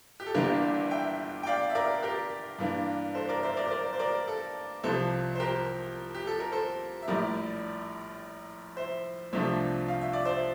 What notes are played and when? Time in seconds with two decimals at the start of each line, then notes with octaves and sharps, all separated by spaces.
0.20 G4
0.26 A4
0.34 G1 G2 E3 A#3 D4 G4 A#4
0.91 E5 G5
1.43 G5
1.47 D5 F5
1.70 E5
1.75 A#4 D5
2.02 G4 A#4
2.58 G2 E3 A#3 D4
3.15 A4 C5
3.29 A#4 D5
3.43 C5 E5
3.57 A#4 D5
3.66 C5
3.71 A#4 D5
3.93 C5
3.99 A#4 D5
4.27 A4
4.83 C2 C3 F3 A4 C5
5.35 C5
5.40 G4 A#4
6.15 G4
6.27 A4
6.40 A#4
6.52 A4 C5
7.02 E5
7.08 A#1 A2 G3 A#4 D5
8.76 C5 E5
9.33 C2 C3 F3 A3 D4 C5 E5
9.88 F5
10.01 E5
10.13 D5
10.25 C5 E5